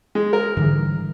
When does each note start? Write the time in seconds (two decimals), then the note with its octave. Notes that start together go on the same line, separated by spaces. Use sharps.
0.15 G#3
0.33 A#4
0.57 G#2 D3 E3 G3